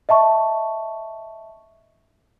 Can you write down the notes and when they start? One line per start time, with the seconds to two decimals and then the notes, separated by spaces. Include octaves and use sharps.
0.09 D#5 E5 A5 C#6